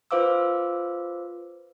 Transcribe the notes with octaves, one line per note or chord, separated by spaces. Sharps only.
F4 B4 C5 F5 D6 E6